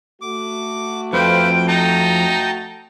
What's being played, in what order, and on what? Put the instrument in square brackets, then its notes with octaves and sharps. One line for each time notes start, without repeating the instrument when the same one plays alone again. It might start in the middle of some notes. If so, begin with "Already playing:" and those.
[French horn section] A3 F#4 [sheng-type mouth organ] D6
[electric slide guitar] F2 [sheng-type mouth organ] B4 C5 F5 [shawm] G5
[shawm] D#4 [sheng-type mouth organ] G5 A5 A#5